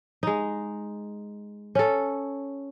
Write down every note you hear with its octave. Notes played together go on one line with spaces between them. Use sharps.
G#3 D#4
C#4 A4